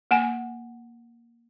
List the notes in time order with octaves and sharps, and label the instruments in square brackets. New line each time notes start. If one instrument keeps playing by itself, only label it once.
[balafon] A#3 F#5 G#5